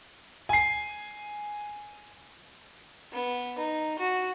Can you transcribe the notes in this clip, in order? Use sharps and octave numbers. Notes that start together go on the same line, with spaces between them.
G#5 C7
B3
D#4
F#4